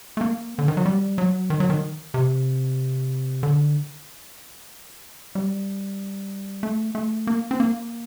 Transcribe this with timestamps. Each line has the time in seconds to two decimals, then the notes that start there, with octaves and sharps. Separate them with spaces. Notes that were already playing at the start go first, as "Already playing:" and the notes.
0.17 A3
0.21 A#3
0.59 D3
0.68 D#3
0.77 F#3
0.86 G3
1.18 F#3
1.50 D#3
1.60 F#3
1.70 D#3
2.14 C3
3.43 D3
5.35 G3
6.63 A3
6.95 A3
7.27 A#3
7.51 C4
7.60 A#3